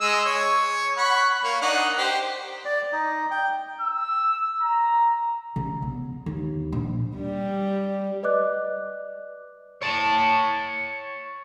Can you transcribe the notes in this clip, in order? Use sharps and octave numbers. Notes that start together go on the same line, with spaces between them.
G#3 D#5 E6
C#5
F#5 B5 C#6
A#3 C#5
D4 D#4 F#5
G4 C5
D5
D#4
G5
E6
A#5
C#3
B3
D#2
A#1
G3 G4
B4 D5 D#5 D6 F#6
C#5 A5